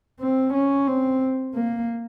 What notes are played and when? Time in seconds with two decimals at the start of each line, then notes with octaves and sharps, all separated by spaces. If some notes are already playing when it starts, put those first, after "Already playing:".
0.20 C4
0.54 C#4
0.87 C4
1.55 A#3